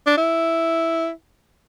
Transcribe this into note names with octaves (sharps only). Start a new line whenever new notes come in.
D4
E4